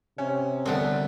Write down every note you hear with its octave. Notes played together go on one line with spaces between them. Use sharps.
C3 C#4
C2 D3 F3 B3 C4